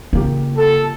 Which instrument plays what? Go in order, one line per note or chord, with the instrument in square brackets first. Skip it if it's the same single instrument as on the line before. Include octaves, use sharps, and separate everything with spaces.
[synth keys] C#3 A#3 G4 [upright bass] F4
[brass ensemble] A4